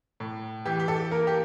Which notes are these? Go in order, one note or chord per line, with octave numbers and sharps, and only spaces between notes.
A2
E3 G4
G4
A4
A#3 A#4
G4